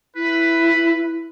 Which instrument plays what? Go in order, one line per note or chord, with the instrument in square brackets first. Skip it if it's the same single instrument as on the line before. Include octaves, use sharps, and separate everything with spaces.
[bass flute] E4 [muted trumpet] B4